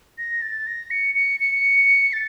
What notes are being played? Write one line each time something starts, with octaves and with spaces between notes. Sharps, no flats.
A#6
A6
A#6
C#7
C#7
C#7
A6